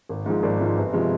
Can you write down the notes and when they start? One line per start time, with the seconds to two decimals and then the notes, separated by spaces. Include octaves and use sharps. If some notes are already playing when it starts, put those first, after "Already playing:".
0.09 G#1
0.26 G#2 F3 G#3
0.43 G#1 D5
0.60 G#2 F3 G#3
0.77 G1
0.93 C3 F3 G#3